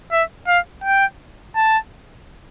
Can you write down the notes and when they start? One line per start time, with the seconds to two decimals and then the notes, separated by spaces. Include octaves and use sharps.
0.12 E5
0.48 F5
0.84 G5
1.56 A5